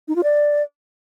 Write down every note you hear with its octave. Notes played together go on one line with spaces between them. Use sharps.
D#4
F4
D5